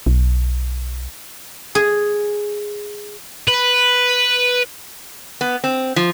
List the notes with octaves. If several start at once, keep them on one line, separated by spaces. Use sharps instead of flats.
B1
G#4
B4
B3
C4
F3